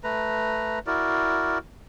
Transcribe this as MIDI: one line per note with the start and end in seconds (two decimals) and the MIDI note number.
0.04 0.79 57
0.04 0.79 71
0.04 0.79 82
0.87 1.58 64
0.87 1.58 66
0.87 1.58 70
0.87 1.58 74